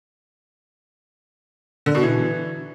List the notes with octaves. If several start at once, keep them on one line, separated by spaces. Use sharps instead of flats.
D3
B2
E3